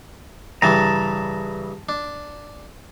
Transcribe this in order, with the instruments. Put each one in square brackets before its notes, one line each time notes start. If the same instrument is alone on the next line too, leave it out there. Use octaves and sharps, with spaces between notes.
[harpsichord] G2 C#3 E3 [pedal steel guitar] A5 A#5
[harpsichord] D4